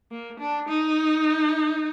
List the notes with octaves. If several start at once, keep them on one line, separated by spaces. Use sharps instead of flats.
A#3
D4
D#4